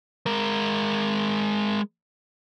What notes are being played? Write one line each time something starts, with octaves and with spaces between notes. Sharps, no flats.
G#3 A#4